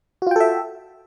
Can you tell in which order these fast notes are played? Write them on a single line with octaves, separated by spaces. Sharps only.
F#4 F4 G5 A4 E5